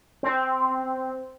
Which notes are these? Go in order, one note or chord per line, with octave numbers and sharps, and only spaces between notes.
C4